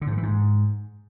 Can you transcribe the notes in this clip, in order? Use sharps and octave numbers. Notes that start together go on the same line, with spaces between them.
D3
G#2
D#3
E3
G#2